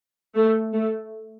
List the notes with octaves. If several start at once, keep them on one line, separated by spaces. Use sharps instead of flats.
A3
A3